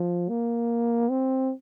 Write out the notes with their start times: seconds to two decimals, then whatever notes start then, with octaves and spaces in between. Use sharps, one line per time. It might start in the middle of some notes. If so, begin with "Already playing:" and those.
Already playing: F3
0.29 A#3
1.10 C4